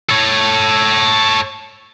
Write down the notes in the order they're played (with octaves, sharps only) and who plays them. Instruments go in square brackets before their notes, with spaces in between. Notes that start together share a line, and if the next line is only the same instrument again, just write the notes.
[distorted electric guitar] A4 C#5